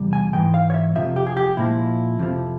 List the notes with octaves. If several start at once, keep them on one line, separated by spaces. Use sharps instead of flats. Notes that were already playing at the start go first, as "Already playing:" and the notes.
Already playing: E2 C3 G3
G#5
G#2 E3 G#3 G5
F5
C#5
E5
F2 C3 F3 E5
G4
G#4
G4
A#2 F3 G#3 E4
F2 C3 F3